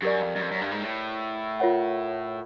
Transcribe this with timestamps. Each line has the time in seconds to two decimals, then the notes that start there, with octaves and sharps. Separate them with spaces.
0.02 F#2 G4 A#4 D5
0.22 F2
0.35 F#2
0.41 F2
0.51 F#2
0.61 G2
0.71 G#2
0.81 A2
1.60 F4 A#4 C#5 F#5